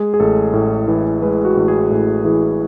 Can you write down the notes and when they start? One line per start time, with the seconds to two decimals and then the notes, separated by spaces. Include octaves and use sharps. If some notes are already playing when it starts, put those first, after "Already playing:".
Already playing: G#3 G#4
0.14 G#4
0.20 A1 A4
0.53 A2
0.88 E3
1.22 G#3 B4
1.45 F#4
1.57 A1
1.68 G#4
1.91 A2
2.24 E3 G#4